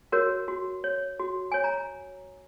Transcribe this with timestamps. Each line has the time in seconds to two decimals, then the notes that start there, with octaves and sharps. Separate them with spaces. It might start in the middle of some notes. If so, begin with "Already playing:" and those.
0.12 F#4 A#4 C#5
0.48 F#4
0.84 C#5
1.19 F#4
1.52 C#5 G#5
1.64 A#5